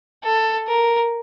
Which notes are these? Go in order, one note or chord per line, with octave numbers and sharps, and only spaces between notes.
A4
A#4